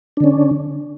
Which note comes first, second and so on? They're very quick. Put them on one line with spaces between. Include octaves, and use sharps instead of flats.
D4 D3 C#4